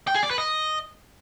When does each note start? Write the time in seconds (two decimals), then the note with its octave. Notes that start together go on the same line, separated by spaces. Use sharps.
0.08 G5
0.15 G#4
0.23 D5
0.30 B4
0.38 D#5